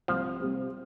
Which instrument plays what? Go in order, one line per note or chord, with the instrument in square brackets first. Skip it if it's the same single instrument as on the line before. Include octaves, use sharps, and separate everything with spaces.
[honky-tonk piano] C2 [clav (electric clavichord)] F3
[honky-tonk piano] C3 G3 C4